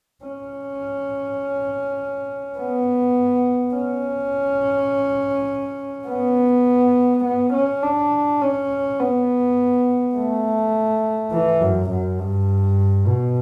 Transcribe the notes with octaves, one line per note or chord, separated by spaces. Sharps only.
C#4
B3
C#4
B3
B3
C#4
D4
C#4
B3
A3
E3
F#2
F#2
G2
B2